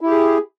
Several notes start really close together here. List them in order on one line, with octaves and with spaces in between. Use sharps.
E4 G4 G#4